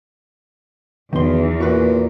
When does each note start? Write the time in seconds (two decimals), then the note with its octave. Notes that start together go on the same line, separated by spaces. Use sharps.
1.13 B1 E2 D#3 C6
1.60 A#2 F#4 B4